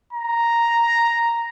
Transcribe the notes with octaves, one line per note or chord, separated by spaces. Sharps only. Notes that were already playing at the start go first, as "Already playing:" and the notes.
A#5